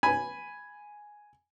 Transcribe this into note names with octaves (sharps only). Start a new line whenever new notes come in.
G#5 B5